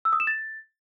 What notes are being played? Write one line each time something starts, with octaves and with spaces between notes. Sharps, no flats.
E6
D#6
E7
A6